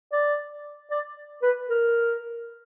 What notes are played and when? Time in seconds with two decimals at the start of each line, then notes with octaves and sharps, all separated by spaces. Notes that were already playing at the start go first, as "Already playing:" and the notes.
0.12 D5
0.91 D5
1.42 B4
1.69 A#4